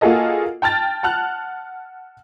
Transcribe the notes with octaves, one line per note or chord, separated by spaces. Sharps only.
A#3 F4 F#4 G#4 A4 D#5
G5 A5 F6 A6
F#5 A5 F6 F#6